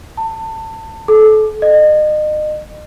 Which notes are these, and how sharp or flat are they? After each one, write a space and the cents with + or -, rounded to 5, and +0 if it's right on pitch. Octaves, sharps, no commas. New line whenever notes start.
A5 +25
A4 -30
D#5 -35